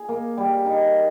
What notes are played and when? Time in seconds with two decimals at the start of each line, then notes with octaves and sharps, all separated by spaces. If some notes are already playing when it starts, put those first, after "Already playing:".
Already playing: G#4
0.09 A#3
0.38 G3
0.66 D#4